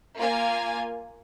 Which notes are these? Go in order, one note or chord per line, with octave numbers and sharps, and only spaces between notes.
A#3 F4 A#4 F5 G#5